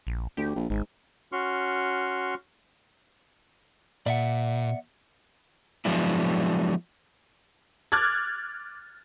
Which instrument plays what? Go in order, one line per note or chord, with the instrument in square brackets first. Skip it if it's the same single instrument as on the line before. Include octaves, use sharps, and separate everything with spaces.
[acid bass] A#1
[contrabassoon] D2 [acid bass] G4
[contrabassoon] A#1
[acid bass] G#1 [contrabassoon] G#2
[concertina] C#4 F#4 C6 C#6 F6
[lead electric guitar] A#2 [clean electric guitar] D5 E5 F#5
[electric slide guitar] F3 F#3 G#3 B3 D4 E4
[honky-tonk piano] D6 F6 F#6 G#6 A6